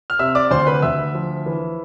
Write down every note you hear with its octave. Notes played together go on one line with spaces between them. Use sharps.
F6
C3 E5 E6
D5 D6
D2 C5 C6
B4 B5
D2 E5 E6
F3
E3